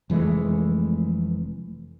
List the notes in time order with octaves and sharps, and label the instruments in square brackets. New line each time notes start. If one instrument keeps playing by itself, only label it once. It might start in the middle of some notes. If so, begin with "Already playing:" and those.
[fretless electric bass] F1 E3 G#3 A3